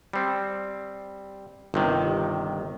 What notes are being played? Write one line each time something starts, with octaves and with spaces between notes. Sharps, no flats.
G3 C4
G1 C3 D#3